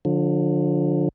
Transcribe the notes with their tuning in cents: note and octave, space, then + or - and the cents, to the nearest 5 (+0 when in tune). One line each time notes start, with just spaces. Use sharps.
D3 +0 F3 +30